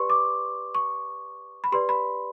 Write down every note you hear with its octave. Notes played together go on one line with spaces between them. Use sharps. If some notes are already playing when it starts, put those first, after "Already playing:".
Already playing: G4 B4 D5 C6 C#6
D6
C#6
B5
G4 B4 D5 C6
B5